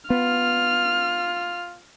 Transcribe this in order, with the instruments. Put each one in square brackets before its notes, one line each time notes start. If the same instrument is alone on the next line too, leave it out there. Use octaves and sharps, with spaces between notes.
[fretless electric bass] B3 [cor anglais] F4 [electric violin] F6